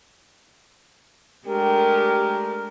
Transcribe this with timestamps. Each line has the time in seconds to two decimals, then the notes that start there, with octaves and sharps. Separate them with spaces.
1.47 G#3 A3 D4 G4 A#4